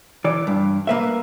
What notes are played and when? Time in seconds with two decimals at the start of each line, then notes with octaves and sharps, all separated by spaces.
0.24 E3 D5
0.47 G2
0.87 A#3 B4 E5